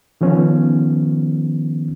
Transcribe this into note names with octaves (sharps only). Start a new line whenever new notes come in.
D#3 F3 B3 C#4